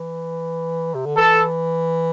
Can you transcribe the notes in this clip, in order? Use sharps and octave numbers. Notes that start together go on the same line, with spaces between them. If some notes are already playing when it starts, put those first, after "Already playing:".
Already playing: E3
C3
D3
E3 A4